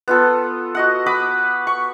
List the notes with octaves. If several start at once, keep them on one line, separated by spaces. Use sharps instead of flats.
B3 F4 A4
F#4 D#5 F#5
F#5 B5 D6 D#6
C#6